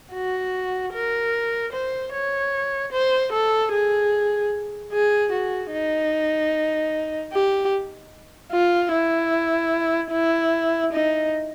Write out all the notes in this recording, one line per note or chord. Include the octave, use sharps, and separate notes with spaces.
F#4
A#4
C5
C#5
C5
A4
G#4
G#4
F#4
D#4
G4
F4
E4
E4
D#4